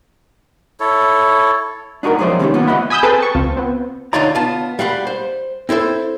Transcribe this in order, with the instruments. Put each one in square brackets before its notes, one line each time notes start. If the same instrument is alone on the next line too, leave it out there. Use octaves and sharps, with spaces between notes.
[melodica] E4 A4 C#5
[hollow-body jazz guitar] D4 D#4 F#4 G#4 A#4
F2 F#3 G#4 C5 D5 E5
D#3 G3 A3 A#3 C#4 D#4
A#3 B3 F4
D2 F3 D#5 E5 F#5 B5
[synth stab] G#5 B5 D#6 E6 G6
C4 G#4 A4 B4 G5 A5
A5 C#6
C#2 C4 F4
B3 C4
[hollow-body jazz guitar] D3 D#4 F4 C#5 D5 A#5
B3 F4 A5
G3 F5 F#5 B5
C5
C4 E4 A4 C5